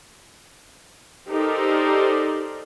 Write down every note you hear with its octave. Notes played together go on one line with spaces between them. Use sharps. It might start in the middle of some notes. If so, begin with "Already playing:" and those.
D#4 G4 A4 A#4 C5 D5